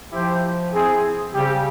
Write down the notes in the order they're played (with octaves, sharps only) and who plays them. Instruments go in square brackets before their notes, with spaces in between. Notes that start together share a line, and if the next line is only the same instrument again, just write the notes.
[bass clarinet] F3 [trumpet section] E4 G4 C5 G5
[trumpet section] C4 E4 G#4
[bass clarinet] C#3 [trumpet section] G3 C4 G4